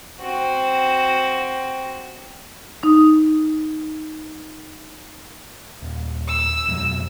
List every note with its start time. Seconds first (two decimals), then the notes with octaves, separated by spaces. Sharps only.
0.20 C4 F#4
2.83 D#4 D#6
5.82 D#1
6.28 E6
6.67 F2 B2 F#3